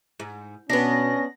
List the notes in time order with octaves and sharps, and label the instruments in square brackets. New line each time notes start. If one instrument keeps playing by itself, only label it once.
[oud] G#2
[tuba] B2 [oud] B3 D4 [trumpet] C#4 [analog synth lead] A#6